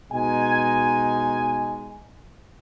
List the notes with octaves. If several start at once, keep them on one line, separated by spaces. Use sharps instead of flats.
B2 G#3 D#4 G#5